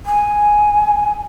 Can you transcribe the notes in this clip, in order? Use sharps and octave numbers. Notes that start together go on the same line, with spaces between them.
G#5